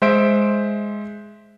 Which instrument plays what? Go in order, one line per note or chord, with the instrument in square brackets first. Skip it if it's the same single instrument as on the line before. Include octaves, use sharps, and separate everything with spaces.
[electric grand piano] G#3 C5 E5 D7